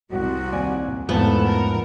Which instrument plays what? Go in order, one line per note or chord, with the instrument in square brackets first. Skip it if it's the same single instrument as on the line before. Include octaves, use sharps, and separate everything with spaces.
[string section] C2 [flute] F#4
[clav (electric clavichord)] D#2 D5 G#5
[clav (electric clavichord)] E2 G#2 F3 [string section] A3 A4 [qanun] B3 [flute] F#5
[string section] A#4